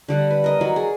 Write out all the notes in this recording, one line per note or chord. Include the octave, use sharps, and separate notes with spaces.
D3 G3 F#5
B4
A#4 D#5
F#3 D5
G#4